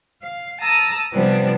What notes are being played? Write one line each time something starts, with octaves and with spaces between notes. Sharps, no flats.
F5
A5 A#5 D#6 E6
C3 F3 G3 B3 C4 D4